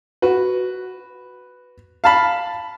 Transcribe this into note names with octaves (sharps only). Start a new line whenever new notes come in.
F#4 B4
F5 A5 B5